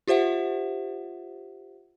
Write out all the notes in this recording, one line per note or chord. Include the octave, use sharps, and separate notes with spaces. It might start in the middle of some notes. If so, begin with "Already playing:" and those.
F4 G4 C5 E5 F#5